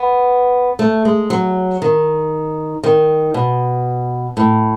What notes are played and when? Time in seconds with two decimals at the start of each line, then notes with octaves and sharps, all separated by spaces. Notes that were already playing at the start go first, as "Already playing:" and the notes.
Already playing: B3
0.79 A3
1.05 G#3
1.30 F#3
1.82 D#3
2.84 D#3
3.34 B2
4.37 A2